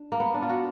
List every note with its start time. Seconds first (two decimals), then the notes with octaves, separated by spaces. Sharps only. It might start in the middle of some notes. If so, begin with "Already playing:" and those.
Already playing: D4
0.12 A#3
0.20 B3
0.34 D4
0.42 F4
0.49 F#4